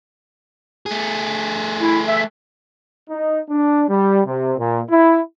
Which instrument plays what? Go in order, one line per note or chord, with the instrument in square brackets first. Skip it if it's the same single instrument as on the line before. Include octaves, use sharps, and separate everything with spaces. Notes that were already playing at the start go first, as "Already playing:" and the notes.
[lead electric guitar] A3 G#4
[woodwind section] E4
E5
[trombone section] D#4
D4
G3
C3
A#2
E4